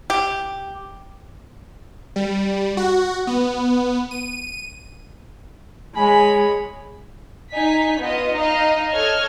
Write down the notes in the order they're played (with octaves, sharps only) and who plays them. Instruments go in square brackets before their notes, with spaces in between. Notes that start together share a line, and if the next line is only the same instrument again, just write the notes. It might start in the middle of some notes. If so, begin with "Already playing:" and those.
[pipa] G4
[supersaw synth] G3
F#4
B3
D#7
[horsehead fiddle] G#3 [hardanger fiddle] C#5 B5 [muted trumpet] G#5
[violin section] D#4 G#5 B6
B3 F4 D#5
D#4 D#5 F5
A4 C#5 D#5 F6 G#6